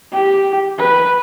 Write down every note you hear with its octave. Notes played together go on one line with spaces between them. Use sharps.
G4
B4